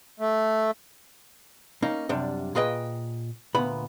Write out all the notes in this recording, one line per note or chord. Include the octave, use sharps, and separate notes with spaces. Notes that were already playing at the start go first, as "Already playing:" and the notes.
A3
A#3 C#4 D#4
F#2 C3 G3 D4
A#2 F4 G#4 B4 D#5 G5
D2 A#2 B3 B5